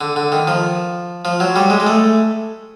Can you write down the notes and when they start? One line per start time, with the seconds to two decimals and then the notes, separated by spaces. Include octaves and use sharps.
0.01 D3
0.16 D3
0.32 D#3
0.47 F3
1.25 F3
1.40 F#3
1.56 G3
1.70 G#3
1.80 G#3
1.87 A3